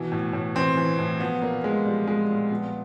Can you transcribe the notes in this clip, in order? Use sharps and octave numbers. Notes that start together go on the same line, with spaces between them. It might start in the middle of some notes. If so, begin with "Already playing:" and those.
Already playing: B2 E3
A2
A2
E3 C4
E3
A2
F3 B3
A#2 A#3
A#2 G#3
F3 G3
F3 G#3
A#2
F3 B3